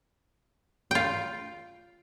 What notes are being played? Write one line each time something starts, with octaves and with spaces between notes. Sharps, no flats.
F4 G5